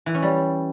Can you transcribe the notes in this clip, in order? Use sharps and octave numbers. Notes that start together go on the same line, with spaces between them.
E3
C#4
G3